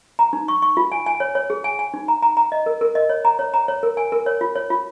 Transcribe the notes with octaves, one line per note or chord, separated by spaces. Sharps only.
A#5
D#4
C#6
C#6
F4
G#5
G#5
C#5
C#5
G#4
G#5
G#5
D#4
A#5
A#5
A#5
D#5
A#4
A#4
D#5
C#5
A#5
C#5
A#5
C#5
A#4
G#5
A#4
C#5
F4
C#5
F4